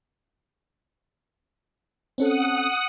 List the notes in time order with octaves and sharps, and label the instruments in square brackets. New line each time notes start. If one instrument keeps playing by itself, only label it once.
[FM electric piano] C4 C#4 A4 [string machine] F#5 D#6